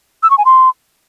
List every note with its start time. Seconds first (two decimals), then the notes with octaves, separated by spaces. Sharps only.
0.23 E6
0.30 C#6
0.38 G#5
0.45 C6